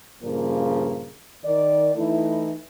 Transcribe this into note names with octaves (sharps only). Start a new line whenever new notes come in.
G2 A#2 C#3 F3 A#3
D#3 D5
E3 A3 D#4 E4